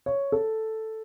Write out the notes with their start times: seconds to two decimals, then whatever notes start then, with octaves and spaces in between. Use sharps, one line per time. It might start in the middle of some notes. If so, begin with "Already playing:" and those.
0.06 C#5
0.32 A4